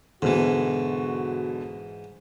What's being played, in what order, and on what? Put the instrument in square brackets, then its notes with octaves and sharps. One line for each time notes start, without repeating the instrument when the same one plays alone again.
[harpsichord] G#2 E3 [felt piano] B2 D3 [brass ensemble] F#4